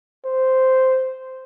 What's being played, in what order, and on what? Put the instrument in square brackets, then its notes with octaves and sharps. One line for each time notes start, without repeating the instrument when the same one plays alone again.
[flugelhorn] C5